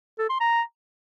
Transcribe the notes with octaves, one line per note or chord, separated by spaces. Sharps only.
A4
C6
A#5